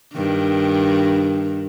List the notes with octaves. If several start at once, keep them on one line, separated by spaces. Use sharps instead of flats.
G2 D#3